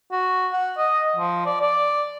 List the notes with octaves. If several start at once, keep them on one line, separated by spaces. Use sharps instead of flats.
F#4
F#5
D#5
F3
D5
D5